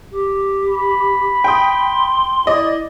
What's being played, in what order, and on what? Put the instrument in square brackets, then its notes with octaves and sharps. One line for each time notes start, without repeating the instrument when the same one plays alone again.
[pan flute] G4
[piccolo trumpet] B5
[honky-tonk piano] G5 D#6 [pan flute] C6
[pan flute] E4 [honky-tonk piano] D5 D#5